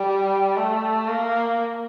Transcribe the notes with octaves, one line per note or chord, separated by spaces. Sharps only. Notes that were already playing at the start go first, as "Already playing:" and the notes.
Already playing: G3
A3
A#3